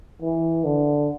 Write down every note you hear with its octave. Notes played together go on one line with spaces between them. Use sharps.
E3
D3